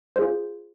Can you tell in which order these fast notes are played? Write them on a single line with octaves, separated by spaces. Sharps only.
C5 G#4 F4